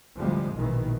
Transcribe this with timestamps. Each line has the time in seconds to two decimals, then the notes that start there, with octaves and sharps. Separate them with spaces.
0.18 F1 D2 A2 F3 G3 G#3
0.56 A#1 B2 D#3 E3